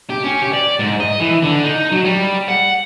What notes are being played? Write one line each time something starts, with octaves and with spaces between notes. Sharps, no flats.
G4
C#4
G4
D5
G#2
D#5
E3
D3
D#4
F#3
G3
F#5